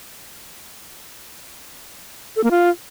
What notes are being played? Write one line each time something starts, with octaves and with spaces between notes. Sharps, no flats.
A4
A#3
F4